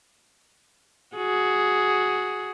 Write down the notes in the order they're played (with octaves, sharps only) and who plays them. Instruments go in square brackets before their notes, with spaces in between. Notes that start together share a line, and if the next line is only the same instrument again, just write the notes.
[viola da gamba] F#4 G#4